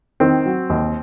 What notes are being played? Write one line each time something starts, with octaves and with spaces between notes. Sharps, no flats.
D#3 C4
F#3
D#2